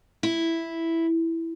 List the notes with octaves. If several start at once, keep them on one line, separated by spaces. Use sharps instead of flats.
E4